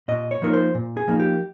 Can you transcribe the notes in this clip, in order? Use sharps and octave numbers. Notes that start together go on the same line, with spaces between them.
A#2 D#5
C#5
F3 A#3 D#4 A#4
C5
A#2
G#4
F3 A#3 D#4
G4